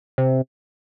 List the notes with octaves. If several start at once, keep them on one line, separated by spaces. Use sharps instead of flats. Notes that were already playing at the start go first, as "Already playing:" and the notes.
C3